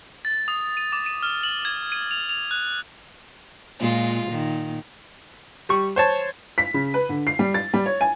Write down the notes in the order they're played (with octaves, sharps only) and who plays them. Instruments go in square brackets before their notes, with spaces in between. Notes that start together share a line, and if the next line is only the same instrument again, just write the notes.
[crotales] A6
D#6
D#7
D6
D#7
F6
F#7
G#6
D#7
F7
F7
F#6
[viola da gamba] A#2 G#3 F4
A#2 D#3
[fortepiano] G3 C#6
C5 C#5 A5
[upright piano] B6
C#3
B4
D3
C7
G3
A6
G3
C#5
G#5